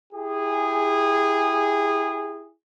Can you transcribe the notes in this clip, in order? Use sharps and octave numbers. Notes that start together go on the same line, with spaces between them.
E4 G4 G#4